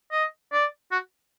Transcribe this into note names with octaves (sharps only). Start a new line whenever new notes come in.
D#5
D5
F#4